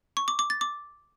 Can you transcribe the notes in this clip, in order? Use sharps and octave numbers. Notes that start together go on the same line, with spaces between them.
C#6
D6
D6
A6
D6